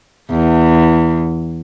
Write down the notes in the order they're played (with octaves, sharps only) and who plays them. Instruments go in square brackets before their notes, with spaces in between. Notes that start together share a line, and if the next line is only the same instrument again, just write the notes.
[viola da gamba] E2